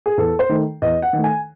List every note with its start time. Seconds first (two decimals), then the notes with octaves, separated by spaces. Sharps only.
0.06 G#4
0.17 E2 A4
0.39 C5
0.49 D#3 A3
0.82 E2 D#5
1.02 F#5
1.13 D#3
1.18 A3
1.24 G#5